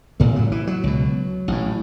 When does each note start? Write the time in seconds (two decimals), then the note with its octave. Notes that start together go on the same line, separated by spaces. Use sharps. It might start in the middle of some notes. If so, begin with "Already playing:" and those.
0.20 A1 A2 A3
0.36 F#3
0.52 E3
0.67 F#3
0.83 C#2 B2
1.48 A1 A2